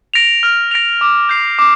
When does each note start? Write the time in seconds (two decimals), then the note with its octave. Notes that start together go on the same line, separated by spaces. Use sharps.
0.14 A#6 D7 F7
0.43 F6
0.71 A#6 D7 F7
1.01 D6
1.29 G6 C7 F7
1.59 D6